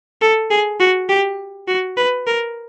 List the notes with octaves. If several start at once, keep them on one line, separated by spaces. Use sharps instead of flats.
A4
G#4
F#4
G4
F#4
B4
A#4